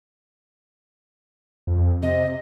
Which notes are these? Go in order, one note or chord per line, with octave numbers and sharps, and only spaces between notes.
F2
C3 D#5